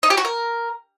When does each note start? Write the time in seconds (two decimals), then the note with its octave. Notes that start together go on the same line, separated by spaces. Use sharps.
0.03 D#4
0.10 G4
0.17 F#4
0.25 A#4